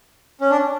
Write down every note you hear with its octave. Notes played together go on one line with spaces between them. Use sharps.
C#4
D4